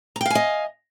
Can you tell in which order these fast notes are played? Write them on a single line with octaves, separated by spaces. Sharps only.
A#5 G5 F5 G#5 D#5